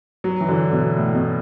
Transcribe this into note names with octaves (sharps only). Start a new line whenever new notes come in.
F#3
E3
D3
B2
A2
B2